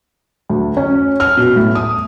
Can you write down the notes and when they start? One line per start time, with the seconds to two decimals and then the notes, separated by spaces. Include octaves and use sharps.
0.49 D2
0.77 C#4
1.20 F6
1.37 B2
1.56 A2
1.75 D#6